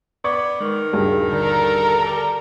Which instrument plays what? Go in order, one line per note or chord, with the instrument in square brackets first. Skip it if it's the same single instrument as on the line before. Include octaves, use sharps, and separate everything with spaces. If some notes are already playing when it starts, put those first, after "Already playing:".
[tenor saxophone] B3 [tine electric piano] D5 D6 G#6 [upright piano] C#6
[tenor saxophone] D#3 [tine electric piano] G#3
[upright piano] D#1 G2 C#3 [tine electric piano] F#4 G#4
[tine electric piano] D3 D5 [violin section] A4 A#4 A#5
[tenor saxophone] G3